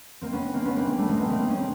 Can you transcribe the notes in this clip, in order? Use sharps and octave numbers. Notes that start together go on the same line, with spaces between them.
A#3 C4
B3 C#4
A#3 C4
B3 C#4
A#3 C4
A#3 C4
G3 A3
G#3 A#3
A3 B3
A#3 C4
C#4
C4